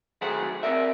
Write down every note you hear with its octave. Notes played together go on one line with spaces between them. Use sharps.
D#3 F#3 A3 G#4 C5 F#5
C4 A#4 D5 E5